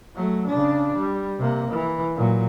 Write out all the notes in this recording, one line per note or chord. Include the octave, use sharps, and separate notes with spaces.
F#3 A3
C#3 D4
G3
C3 A#3
E3
A#2 F#3